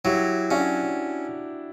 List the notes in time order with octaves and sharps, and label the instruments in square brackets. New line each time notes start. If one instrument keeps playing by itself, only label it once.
[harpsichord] F#3 [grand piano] E4 G4
[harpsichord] C#4 [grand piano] D4 F#4